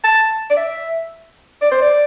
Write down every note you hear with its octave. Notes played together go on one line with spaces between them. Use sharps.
A5
D5
E5
D5
C5
D5